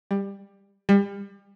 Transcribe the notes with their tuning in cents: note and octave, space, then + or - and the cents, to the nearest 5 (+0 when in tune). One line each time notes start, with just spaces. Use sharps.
G3 +20
G3 +35